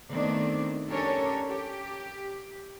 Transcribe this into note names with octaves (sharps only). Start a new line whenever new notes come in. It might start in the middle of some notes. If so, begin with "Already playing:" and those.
D#3 A3 B3 C4 D4 D5
C#4 D4 G4 A4 A#4 C#5
G4